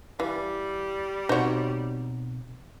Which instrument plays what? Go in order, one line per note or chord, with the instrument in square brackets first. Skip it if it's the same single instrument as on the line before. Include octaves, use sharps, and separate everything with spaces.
[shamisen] E3 [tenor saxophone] G3 [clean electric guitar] F5
[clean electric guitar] B2 C4 A#5 [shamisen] D#4 F#4 [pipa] C5 C#5